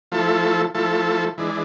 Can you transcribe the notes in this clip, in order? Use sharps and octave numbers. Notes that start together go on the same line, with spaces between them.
F3 A3 E4 A4
F3 A3 E4 A4
E3 G#3 D4